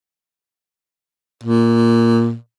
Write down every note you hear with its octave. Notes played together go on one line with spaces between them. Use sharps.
A#2